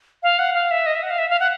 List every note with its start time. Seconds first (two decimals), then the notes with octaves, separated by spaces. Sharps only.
0.23 F5
0.39 F#5
0.54 F5
0.71 E5
0.86 D#5
0.95 E5
1.03 F#5
1.10 F5
1.18 E5
1.30 F5
1.40 F#5